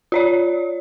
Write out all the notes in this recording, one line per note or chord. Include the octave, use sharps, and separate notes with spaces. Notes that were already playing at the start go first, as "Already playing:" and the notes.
F4 C#5 D5